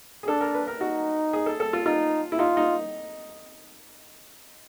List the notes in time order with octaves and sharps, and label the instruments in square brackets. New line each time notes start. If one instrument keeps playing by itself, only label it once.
[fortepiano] G#4
[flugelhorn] D4 [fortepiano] A4
[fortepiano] A#4
B4
A#4
[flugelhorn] D#4 [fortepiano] F#4
[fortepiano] G#4
A4
A4
F4
[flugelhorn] D#4 [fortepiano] F4
[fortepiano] E4
[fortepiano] D#4 [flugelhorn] F4
[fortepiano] D#4